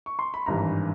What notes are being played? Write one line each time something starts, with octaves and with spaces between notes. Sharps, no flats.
C#6
C6
B5
G#1 G2 E3 A#5